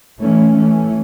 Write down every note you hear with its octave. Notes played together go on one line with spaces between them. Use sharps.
E3 A3 C#4
E3 A3 C#4